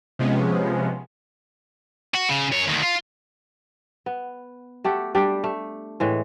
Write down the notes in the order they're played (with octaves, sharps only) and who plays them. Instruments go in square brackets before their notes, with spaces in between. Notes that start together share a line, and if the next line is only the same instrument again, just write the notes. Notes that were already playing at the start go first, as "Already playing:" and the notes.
[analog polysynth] C3 F3 G#3 B3 C#4
[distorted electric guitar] F#4
C#3
F#2 C#5
D2 D#3
F4
[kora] B3
A3 G4 A4 F#5
G3 D4 G4
A3
A2 E3 G#3